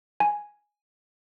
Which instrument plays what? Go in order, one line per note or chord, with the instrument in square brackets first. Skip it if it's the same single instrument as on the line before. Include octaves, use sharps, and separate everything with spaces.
[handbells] G#5